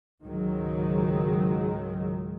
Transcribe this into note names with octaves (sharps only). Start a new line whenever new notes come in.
C#2 G#2 D#3 F#3 G#3